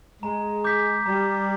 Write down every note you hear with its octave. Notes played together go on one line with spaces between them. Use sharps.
G#3 A#5
D6 G6 B6
G3 A#5